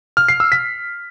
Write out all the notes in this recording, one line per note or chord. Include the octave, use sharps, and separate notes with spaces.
F6
C7
E6
B6